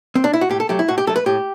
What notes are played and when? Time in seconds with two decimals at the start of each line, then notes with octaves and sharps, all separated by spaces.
0.15 C4
0.24 D4
0.33 E4
0.41 F#4
0.49 A2 G4
0.60 A4
0.69 F#3 A3 G4
0.79 E4
0.88 A2 F#4
0.98 G4
1.07 F#3 A3 A4
1.16 B4
1.26 A2 G4